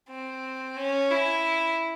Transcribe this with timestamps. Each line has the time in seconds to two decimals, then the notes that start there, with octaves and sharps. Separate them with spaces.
0.09 C4
0.77 C#4
1.10 E4